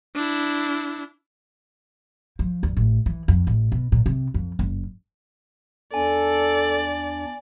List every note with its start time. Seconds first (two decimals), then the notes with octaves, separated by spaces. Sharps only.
0.15 D4 E4
2.39 F3
2.63 E2
2.77 A1
3.06 E3
3.28 F2
3.47 A1
3.72 B2
3.92 A#2
4.06 C3
4.34 F2
4.59 F#1
5.94 E2 D4 A4 D5 G#5